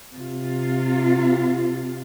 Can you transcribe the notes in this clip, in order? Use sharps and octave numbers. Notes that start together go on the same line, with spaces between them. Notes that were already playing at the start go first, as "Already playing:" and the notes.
C3 F4